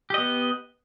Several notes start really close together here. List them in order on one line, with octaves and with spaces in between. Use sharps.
G4 D#5 B3